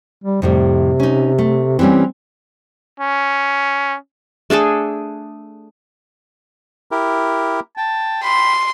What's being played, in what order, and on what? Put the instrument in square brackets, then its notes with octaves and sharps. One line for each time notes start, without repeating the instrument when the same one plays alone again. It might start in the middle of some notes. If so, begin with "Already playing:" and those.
[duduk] G3
[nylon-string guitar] F2 A2 G3 [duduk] C3
[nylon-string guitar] C#4 D#4
A3
[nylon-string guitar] E3 G3 C#4 [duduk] C4
[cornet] C#4
[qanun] A3 D4 G#4 A4
[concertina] E4 G4 A#4
[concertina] G5 [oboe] A5
[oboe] B5 [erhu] C6